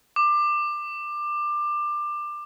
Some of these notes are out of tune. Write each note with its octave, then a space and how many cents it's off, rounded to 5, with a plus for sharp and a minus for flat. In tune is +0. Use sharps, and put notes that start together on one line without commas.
D6 +20